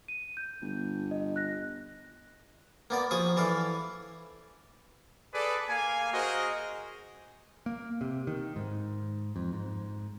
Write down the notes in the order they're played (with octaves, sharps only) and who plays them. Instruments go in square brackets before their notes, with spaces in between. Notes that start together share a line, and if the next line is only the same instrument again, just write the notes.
[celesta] D#7
G6
[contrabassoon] G1
[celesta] D#5
F#6 A#6
[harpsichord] A#3 B3 D5
F3 G#4 C#6 D#6
E3 A4 D5 F5
[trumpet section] G#4 A4 B4 D5
A#3 F5 G#5
F#4 G#4 A#4 C5 D#5
[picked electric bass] A#3
C3
D#3
G#2
F2
G#2